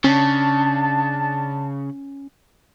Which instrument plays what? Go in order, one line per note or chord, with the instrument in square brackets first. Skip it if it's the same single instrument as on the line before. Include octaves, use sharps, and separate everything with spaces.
[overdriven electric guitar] C#3 [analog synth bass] C#4 [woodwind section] D4 A5